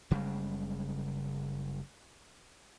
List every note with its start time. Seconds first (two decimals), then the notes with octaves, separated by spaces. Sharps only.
0.11 F#1 C#3 G3 G#3